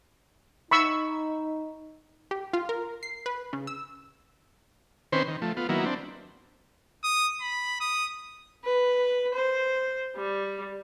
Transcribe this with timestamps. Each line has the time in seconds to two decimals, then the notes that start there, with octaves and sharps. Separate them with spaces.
0.71 D#4 B5 C#6 E6
2.31 G4
2.53 F4
2.69 A#4
3.03 C7
3.26 B4
3.53 C#3
3.67 E6
5.12 D#3 C4 C#4 B4 C5
5.28 D#3
5.42 F3 A3
5.57 B3 F4
5.69 D#3 F#3 A#3 B3 E4
5.85 C4 D4
7.04 D#6
7.41 B5
7.81 D#6
8.64 B4
9.34 C5
10.17 G3